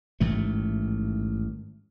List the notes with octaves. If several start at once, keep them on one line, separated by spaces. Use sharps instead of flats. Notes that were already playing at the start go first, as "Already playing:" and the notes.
A1 G#2 D#3 A3